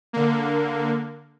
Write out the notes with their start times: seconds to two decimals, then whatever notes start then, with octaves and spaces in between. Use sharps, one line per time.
0.13 D3 A#3